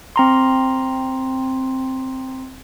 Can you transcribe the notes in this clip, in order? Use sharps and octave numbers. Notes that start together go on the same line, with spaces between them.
C4 A#5 C6